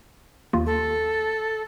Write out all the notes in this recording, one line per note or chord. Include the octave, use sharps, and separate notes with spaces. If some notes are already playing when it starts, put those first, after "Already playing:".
D#2 F4
A4